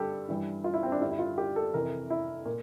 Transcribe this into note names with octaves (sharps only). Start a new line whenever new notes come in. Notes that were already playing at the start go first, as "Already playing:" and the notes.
Already playing: G2 D3 G3 G4 A4
G2 E3 G3
F4
E4
C4
D4
G2 D3 G3 E4
E4
F4
G4
A4
F2 C3 E3 A#4
E4
A#2